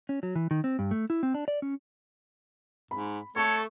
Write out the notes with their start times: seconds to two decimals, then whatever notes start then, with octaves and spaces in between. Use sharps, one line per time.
0.09 C#4
0.23 F#3
0.36 E3
0.51 D#3
0.64 C4
0.79 G2
0.91 A3
1.10 E4
1.23 C4
1.34 D4
1.48 D5
1.62 C#4
2.91 G#2 B5
3.36 A3 A4 C#5 C#6